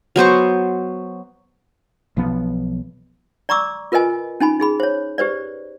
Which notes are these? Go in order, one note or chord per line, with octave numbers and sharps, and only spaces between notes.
F#3 B3 C5 C#6
B1 F3 B3
D5 A#5 C#6 D6 E6
F4 A#4 B4 D#5 G#5
C#4 D#4 G#5 B5
D#4 G#4 B5
C5 C#5
G4 B4 C5 D5